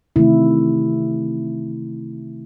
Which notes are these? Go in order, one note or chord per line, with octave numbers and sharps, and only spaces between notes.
C3 D#3 A3 E4